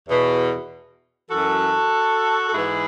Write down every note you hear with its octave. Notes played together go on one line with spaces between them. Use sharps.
E2 B2
F#2 E3 F#4 A4
A4
G#2 E3 E4 G#4